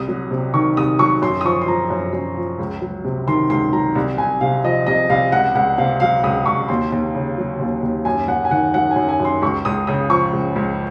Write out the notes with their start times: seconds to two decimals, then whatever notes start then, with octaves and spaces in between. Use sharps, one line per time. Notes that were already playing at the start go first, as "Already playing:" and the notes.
Already playing: C2 D#6
0.08 F#3
0.31 C3
0.54 D#3 C#6
0.77 C2 D#6
0.99 F#3 C#6
1.22 F#2 C6
1.41 D#6
1.45 F3 C#6
1.61 C6
1.67 F3 A#5
1.90 F#2
2.13 F#2
2.37 F3
2.59 C#2
2.81 F#3
3.04 C3
3.27 D#3 C6
3.50 C#2 C6
3.73 F#3 A#5
3.95 C2
4.18 C2 G#5
4.41 C3 F5
4.64 F3 D#5
4.87 C2 D#5
5.10 C2 F5
5.32 C#2 F#5
5.55 C#2 F#5
5.78 C3 F5
6.00 F#3 F5
6.23 C#2 D#6
6.46 C#2 C#6
6.68 D#2 C6
6.92 D#2
7.15 C#3
7.38 F#3
7.59 D#2
7.83 D#2
8.05 F#2 G#5
8.28 F#2 F#5
8.45 G#5
8.51 D#3 F#5
8.74 F#3 F#5
8.91 G#5
8.96 F#2
9.08 G#5
9.20 F#2 C6
9.42 C#2 C#6
9.65 C#2 D#6
9.87 C#3 D#6
10.10 F3 C#6
10.33 C#2
10.56 C#2